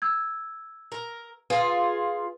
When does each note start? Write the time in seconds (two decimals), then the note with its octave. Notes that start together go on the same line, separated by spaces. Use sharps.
0.02 E6 G#6
0.92 A#4
1.50 F4 G#4 B4